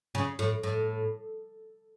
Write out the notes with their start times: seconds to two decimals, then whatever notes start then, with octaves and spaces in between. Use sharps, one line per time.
0.15 C#3
0.39 A2
0.63 A2